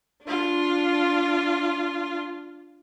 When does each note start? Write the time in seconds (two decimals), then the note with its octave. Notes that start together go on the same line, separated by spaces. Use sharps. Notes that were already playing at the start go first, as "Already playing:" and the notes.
0.24 D4 F4